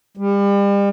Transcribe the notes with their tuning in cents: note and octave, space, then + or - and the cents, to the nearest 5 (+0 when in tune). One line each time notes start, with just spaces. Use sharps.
G3 +35